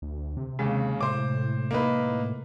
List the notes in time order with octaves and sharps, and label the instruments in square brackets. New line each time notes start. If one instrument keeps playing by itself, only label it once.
[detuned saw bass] D2
C3
[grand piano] D#2 C#3 [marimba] G#3
[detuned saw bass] A2 [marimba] C3 [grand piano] C5 D6
[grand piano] A#3 D#4 B4